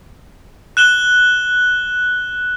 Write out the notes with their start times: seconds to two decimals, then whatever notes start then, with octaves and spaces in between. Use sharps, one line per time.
0.77 F#6 E7 G7